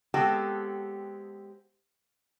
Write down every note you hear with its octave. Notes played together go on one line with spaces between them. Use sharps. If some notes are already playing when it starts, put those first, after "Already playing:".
G#3 B3 C4 F#4 G4 A4